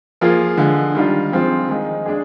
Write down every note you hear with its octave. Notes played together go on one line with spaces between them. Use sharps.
F3 A#3 F4 G#4
D3 F3 G#3
D#3 G3 D4 F4
F3 G#3 C4 F4
D#3 G#3 D#4
G#3 D4 G#4